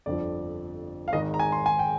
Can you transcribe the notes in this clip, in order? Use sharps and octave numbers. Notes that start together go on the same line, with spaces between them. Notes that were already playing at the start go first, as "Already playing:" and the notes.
G1 F2 D3 F3 D5
F5
G#1 G#2 D#3 G#3 D#5
A#5
G#5
C6
G#5
G5